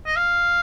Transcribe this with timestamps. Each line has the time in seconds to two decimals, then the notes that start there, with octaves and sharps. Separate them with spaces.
0.06 D#5
0.16 F5